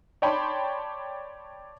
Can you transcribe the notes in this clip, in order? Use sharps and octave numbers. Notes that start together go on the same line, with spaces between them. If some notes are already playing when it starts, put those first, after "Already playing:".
C#5 D5 G5 A5 B5 C6